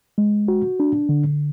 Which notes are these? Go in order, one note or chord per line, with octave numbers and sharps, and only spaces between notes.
G#3
F#4
D4
D3